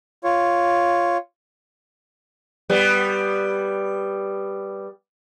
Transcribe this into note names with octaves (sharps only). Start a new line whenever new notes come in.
F4 C#5
G3 B3